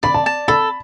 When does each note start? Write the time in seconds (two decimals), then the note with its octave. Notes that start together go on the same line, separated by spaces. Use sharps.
0.03 D5 B5
0.14 A5
0.26 A5
0.48 A4 B5